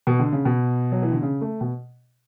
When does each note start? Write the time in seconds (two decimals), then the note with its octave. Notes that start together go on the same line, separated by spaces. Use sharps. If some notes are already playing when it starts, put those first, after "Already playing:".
0.07 B2
0.20 D3
0.32 C#3
0.45 B2
0.92 F#3
1.02 E3
1.12 D3
1.22 C#3
1.41 A3
1.61 B2